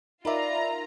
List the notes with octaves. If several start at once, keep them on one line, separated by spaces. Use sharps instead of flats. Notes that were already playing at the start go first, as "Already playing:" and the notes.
D#4 F4 A#4 B4 D5 E5 A#5